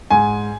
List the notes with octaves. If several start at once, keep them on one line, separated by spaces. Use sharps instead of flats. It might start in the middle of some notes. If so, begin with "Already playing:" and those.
G#2 G#5